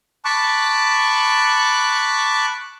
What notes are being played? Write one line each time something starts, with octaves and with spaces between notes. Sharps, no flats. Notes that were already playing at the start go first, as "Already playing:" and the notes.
A5 B5 C#6 D6 F#6